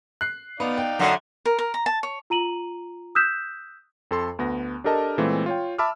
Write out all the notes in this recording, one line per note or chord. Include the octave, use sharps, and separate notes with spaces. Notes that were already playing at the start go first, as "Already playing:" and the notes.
F#6 C7
B3 D#4 D5 F5
G5
F#2 D3 F#5
A#4
A#4
A#5
A5
C#5
F4 A#5 D#7 F#7
D#6 E6 F#6 G6 B6 E7
F2 A4 C6
D2 B3 A#6
D4 G4 A4 A#4 D#5 A5
A#2 E3 G#3 A3 C4
F4 C#5 G5
E5 A5 B5 D6 E6 F6